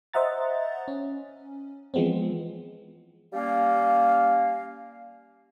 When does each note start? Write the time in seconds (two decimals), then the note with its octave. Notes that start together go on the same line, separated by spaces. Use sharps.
0.13 C5 D#5 E5 F#5 A#5 A6
0.88 C#4
1.94 E3 F3 G#3 B3 C4
3.33 G3 A#3 C#4 F5